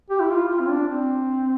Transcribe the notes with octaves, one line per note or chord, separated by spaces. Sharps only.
G4
E4
F4
F4
C4
D4
C4